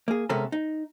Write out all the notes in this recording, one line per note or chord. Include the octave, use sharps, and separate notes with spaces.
A#3 G#4
C3 G#3 B3 C#4 A4 A#4
D#4